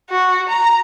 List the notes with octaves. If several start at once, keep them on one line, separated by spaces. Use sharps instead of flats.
F#4
A#5